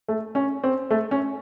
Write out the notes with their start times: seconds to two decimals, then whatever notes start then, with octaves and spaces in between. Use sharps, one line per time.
0.08 A3
0.35 C#4
0.64 C4
0.91 A3
1.11 C#4